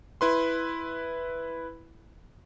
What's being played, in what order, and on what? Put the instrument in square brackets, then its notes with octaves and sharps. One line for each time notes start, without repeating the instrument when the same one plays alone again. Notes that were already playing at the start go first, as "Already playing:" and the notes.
[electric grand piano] E4 B4 C6